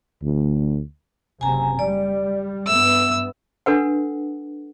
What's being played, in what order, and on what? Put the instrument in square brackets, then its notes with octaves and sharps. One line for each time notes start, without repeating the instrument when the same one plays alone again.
[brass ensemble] D2
[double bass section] F#1 C3 [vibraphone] G#5 A#5
[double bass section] G3 [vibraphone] D5
[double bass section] G2 B3 [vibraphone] E5 [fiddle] E6
[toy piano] D4 A4 B4 F#5